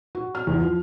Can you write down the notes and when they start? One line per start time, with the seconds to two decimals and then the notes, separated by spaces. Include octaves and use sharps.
0.15 F#4
0.35 F6
0.47 E2
0.61 F3